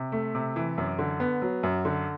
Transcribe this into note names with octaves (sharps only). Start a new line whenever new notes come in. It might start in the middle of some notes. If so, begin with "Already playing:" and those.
Already playing: C3
A3
C3
E3
F#2
D3
B3
F#3
F#2
D3